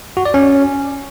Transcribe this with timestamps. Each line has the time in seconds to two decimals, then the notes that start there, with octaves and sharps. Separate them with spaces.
0.17 F#4
0.25 D5
0.34 C#4